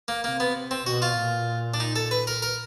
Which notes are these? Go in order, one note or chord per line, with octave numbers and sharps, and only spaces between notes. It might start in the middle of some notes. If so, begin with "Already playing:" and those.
A#3
C3 A#3
B3
C4
B2 F#4
F4
A#2
D4
D#4
A4
B4
A#4
A#4